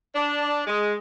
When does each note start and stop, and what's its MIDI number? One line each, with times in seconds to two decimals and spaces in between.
0.14 0.61 62
0.66 0.92 56